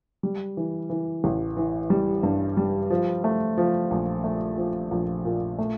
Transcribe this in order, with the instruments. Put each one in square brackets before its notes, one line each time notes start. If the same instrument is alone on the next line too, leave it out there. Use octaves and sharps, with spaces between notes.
[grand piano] G3
E3
E3
A1
E3
G3
G2
G3
F3
A3
F3
A#1
A3
F3
A#1
A#2
A3